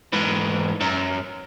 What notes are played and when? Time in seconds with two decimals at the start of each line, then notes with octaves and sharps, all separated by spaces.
0.13 G#2 E3
0.81 F#2